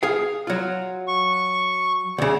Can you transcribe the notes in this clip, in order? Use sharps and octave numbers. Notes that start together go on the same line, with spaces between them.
G#4 F5
F#3 F4
C#6
D2 C#3